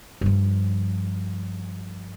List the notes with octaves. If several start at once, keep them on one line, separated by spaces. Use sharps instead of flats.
G2 F3